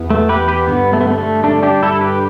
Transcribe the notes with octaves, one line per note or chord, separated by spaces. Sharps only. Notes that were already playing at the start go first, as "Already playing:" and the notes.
Already playing: E2 E3 B3
A3
G4 B4
G4 B4
G2 D3 G3 B3
A3
B3
A3
A3
A3 D4
D4 G4
E4 A4
G4 B4